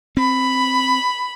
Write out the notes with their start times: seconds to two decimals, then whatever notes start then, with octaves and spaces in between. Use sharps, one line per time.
0.17 C4 B5